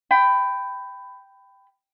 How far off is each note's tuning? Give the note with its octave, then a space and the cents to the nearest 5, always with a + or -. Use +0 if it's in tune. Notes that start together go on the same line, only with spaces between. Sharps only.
G5 +0 B5 +20